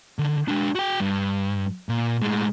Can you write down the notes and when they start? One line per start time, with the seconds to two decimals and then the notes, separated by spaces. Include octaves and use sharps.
0.19 D3 D#3
0.48 G#3 D4
0.75 F#4 G5
1.00 G2
1.89 A#2
2.22 A2 G#3